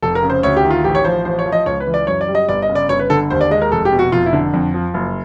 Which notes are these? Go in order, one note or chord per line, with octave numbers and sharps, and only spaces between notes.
F1 A4
A#4
C#3
C5
D2 C#5
G4
D#3
F4
A1 G4
C#5
F3 C5
A1 C5
C#5
F3
D#5
C#2 C#5
B4
E3
D5
F#2 C#5
D5
G3
D#5
G1 D5
D#5
C#3
D5
G1 C#5
B4
D3 A4
D#2 C5
D5
G#3 D#5
A#4
F1 A4
G4
B2
F#4
F1 F4
E4
D3
F2
F3
F#1